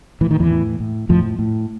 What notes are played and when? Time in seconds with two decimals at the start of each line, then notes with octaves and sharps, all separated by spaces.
0.21 A2 E3
0.31 D#3
0.40 E2 E3
0.50 A2
0.80 A2
1.09 F2 A2 F3
1.39 A2